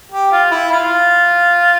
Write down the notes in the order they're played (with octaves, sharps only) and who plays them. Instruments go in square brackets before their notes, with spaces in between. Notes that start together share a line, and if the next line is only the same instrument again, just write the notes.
[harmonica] G4
F4
E4
F4